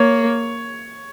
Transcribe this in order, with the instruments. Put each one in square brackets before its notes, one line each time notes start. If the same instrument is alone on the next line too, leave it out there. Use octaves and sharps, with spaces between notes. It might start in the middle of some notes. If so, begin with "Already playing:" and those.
Already playing: [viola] A#3 [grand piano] C#5